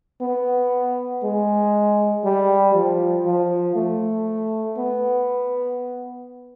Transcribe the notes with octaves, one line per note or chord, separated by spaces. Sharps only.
B3
G#3
G3
F3
F3
A3
B3